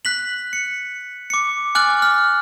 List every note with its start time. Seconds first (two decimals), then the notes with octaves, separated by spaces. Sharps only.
0.05 F#6 B6 F#7
0.53 C#7
1.30 D6 C#7
1.75 G#5 D6 F6 F#6 A6 F#7
2.02 F6